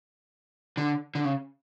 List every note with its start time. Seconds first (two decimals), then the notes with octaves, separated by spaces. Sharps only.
0.77 D3
1.15 D3
1.25 C#3